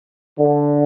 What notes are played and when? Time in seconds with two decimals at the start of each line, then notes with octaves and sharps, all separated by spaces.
0.38 D3